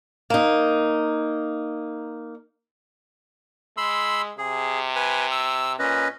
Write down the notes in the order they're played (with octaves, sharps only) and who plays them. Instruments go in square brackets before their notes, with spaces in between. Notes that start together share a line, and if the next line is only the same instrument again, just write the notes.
[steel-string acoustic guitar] A#3 D#4
[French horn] G#3 [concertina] B5 C6 E6
[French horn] C3 [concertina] G#4
[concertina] B4 G#5
E6
[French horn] A#2 [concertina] C#4 B4 D#5